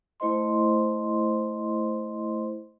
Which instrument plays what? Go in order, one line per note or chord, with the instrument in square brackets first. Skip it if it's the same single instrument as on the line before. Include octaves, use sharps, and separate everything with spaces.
[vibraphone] A3 E4 C5 D#5 C6